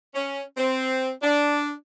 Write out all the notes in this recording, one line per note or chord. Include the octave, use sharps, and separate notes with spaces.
C#4
C4
D4